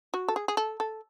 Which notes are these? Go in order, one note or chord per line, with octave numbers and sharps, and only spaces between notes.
F#4
A4
G#4
G#4
A4
A4